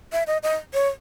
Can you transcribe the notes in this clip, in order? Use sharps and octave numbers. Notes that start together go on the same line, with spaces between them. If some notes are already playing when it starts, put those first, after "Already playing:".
E5
D#5
D#5
C#5